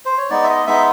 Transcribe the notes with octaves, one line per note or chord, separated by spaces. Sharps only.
C5
C#5
G#3 B3 D#4 D5
E5
D#5
G#3 B3 D#4 E5